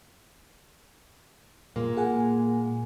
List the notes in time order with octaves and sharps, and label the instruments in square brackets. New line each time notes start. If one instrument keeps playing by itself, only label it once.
[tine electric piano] A#2 [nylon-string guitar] G#3 A#3
[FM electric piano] G#4 F#5 G#5